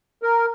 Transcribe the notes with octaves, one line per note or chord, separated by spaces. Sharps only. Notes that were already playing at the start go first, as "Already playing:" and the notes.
A#4